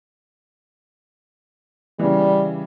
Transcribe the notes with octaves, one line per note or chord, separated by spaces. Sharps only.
C#3 E3 G3